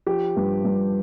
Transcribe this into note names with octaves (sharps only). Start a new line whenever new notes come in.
F3 G4
G2
G2